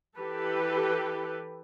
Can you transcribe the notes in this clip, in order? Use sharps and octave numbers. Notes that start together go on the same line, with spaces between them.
E3 G4 A4 B4